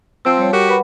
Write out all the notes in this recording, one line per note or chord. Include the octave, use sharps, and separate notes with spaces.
F3 C4 E6
G3 C#5
F#4 G4 A#4
B4 F#5 B5